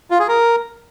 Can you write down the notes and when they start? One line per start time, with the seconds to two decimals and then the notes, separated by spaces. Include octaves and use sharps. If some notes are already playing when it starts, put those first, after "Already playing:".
0.11 F4
0.19 G#4
0.28 A#4